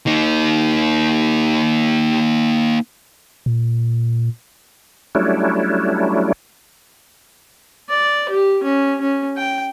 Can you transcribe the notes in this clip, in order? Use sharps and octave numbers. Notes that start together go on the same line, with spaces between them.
A#3 D#4
A#2
F#3 G3 A3 C#4 D4 E4
D5
G4
C#4
C#4
G5